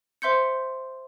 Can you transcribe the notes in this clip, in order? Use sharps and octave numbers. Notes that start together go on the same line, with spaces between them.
C5 E5 C6 G6 C#7